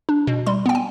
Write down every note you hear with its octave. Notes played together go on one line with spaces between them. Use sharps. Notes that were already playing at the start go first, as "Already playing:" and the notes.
D4
B2
G3 C6
B3 G5
G#5